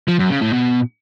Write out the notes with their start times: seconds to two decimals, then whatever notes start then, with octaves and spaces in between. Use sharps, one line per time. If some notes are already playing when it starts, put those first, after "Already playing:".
0.08 F3
0.19 F#2
0.30 C#3
0.41 A2
0.52 B2